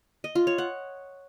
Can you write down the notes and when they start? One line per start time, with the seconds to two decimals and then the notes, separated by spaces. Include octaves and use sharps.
0.24 D#5
0.35 F4
0.47 C#5
0.58 F#5